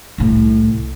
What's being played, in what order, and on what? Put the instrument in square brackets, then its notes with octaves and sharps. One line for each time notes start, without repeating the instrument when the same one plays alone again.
[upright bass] C2 A2